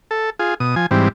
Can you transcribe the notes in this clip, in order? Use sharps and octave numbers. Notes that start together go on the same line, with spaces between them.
A4
F4 G#4
B2 D#6
F3 G#5
G#2 E3 G3 C4